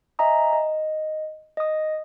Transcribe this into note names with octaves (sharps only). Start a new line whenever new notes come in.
D#5 E5 G#5 A#5 D#6
D#5
D#5 D#6